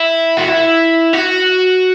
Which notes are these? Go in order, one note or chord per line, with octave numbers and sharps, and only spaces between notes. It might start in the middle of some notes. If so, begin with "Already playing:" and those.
Already playing: E4
F#4
E4
F#4